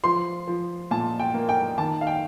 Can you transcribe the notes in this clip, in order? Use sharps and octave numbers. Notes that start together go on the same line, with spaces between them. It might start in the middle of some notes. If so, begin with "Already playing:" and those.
F3 C6
F3
A#2 A5
G5
A#3
G5
D#3 A5
F5
G5